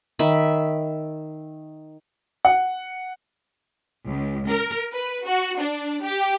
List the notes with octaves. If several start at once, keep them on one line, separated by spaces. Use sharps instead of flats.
D#3 E5 B5
F#5
C#2
A#4
B4
F#4
D4
G4